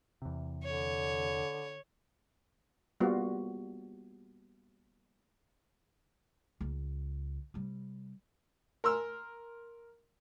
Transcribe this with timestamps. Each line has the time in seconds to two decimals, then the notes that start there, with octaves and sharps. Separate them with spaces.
0.22 E2 C3
0.64 D3 C#5
3.00 G3 A#3 B3 F4 F#4
6.61 C#2
7.54 C3 G3
8.84 A#4 C6 E6 F6